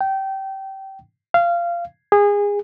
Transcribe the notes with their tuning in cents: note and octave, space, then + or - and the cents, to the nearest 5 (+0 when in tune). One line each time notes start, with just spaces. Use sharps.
G5 -20
F5 -20
G#4 -25